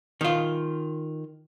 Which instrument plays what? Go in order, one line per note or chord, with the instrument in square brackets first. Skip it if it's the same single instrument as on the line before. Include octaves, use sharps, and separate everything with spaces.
[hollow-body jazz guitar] D#3 F4